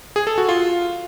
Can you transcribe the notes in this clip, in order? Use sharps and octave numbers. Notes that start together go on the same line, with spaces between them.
G#4
A4
F#4
F4